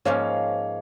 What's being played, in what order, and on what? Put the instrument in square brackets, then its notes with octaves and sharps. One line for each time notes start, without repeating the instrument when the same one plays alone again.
[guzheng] G#2 F3 A#3 C#4 [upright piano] C#5 F5